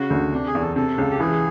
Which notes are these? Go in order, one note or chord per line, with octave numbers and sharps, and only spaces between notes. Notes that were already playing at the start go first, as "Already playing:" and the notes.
Already playing: C#3 F#4
D2
C3 D4
G#4
E2
A4
C3 A4
C#2
G4
E3 G#4